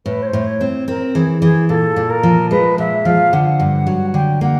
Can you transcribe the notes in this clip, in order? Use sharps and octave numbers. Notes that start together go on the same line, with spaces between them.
A2 B4
C#5
C5
A2
C#5
C4
C4 A#4
E3 G#4
E3 G#4
A#2 A4
A#2
A#4
F3
G#3 B4
A#2 E5
F3 F5
D3 F#5
G2
F#3
D3 G5
A#3 F#5